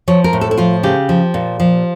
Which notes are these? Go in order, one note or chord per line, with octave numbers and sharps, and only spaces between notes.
F3 C#5
A#4
A2
A4
E4
F3 F4
C#3 G4
F3
A#2
F3